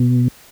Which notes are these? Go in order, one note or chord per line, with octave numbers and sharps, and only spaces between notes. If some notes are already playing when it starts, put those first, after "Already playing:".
Already playing: B2